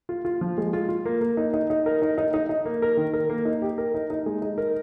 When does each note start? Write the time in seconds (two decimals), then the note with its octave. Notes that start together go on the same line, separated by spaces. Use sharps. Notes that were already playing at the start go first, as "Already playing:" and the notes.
0.09 F4
0.25 F4
0.41 F3
0.58 G#3
0.73 F4
0.89 F4
1.05 A#3
1.21 A#3
1.37 D#4
1.54 D#4
1.70 D#4
1.86 A#4
2.02 D#4
2.18 D#4
2.34 D#4
2.49 D#4
2.65 A#3
2.82 A#4
2.97 D#3
3.13 A#4
3.30 A#3
3.45 D#4
3.62 G4
3.78 A#4
3.94 D#4
4.10 D#4
4.26 G#3
4.42 D#4
4.58 A#4